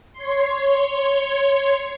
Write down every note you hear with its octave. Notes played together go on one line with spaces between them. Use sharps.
C#5 C6